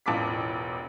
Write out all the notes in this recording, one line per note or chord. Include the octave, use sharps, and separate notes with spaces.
E1 A1 F4 D6 B6